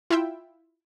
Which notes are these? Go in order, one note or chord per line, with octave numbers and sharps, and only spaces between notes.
E4 F4 E5 G5